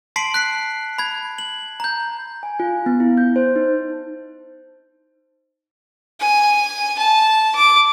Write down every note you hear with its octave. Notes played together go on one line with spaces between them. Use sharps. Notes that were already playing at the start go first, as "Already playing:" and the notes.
A5 C6 B6 C7 D7 F#7
F#6 B6 C7
B5 G#6
F#7
A#5 G6
G#5
F4
B3
E4
G6
C5
D#4
G#5
A5
D6